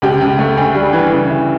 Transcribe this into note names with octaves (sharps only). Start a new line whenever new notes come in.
C#2 G4
C#2
A3
D2
G3
E3
C#3
E4